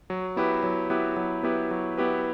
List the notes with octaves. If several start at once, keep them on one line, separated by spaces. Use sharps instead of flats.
F#3
B3 E4 G4 B4
F#3
B3 E4 G4 B4
F#3
B3 E4 G4 B4
F#3
B3 E4 G4 B4